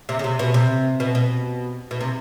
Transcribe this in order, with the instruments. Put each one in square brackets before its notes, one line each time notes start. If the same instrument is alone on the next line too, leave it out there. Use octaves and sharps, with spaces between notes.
[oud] C3
C#3
C3
B2
C3
B2
B2
B2
C3